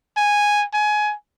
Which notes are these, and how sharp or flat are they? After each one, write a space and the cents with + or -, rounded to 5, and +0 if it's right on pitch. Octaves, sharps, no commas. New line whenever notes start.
G#5 -5
G#5 +20